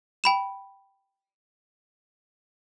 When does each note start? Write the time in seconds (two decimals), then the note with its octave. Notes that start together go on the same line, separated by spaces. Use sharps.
0.24 G5 B5 E7